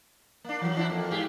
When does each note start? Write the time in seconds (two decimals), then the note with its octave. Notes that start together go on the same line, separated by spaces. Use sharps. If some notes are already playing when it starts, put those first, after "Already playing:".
0.44 A#3 D4
0.62 E3 F#3
0.75 E3 D4 E4
0.90 F2 A#3
1.10 G#2 G4 G#4